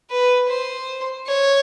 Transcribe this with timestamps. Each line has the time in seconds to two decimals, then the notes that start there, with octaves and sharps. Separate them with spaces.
0.11 B4
0.49 C5
1.27 C#5